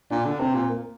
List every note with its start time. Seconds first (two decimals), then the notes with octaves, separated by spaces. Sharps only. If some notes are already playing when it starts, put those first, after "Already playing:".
0.11 A#2 D4
0.25 D3
0.40 C3 C4
0.55 A#2
0.69 A#3